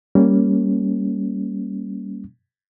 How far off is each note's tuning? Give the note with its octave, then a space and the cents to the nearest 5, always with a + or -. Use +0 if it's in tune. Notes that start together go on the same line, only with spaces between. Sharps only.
G3 +0 A#3 +0 C#4 +0